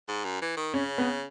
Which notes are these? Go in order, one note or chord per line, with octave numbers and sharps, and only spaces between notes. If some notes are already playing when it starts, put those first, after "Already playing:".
G#2
F#2
E3
D#3
C#3 C#4
B3